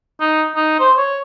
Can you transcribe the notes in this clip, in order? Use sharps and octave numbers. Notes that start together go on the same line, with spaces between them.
D#4
D#4
C5
C#5